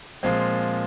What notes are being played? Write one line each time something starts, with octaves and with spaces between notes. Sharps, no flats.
A#2 F3 G#3 C4